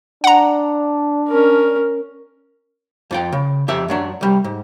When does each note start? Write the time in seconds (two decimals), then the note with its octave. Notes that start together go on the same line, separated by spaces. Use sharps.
0.24 D4 F#5 A#5
1.28 C#4 A#4
3.11 F2 F4 G5
3.32 C#3
3.68 F2 G4 E5
3.88 F#2 F#3 D4
4.21 C2 G3
4.44 G#2